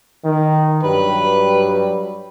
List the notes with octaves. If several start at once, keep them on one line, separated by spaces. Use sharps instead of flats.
D#3
G2 F#3 G3 B4